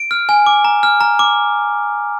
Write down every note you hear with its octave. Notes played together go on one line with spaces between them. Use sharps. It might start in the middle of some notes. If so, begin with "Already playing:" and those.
Already playing: D7
F6
G#5
D6
A#5
F6
A#5
D6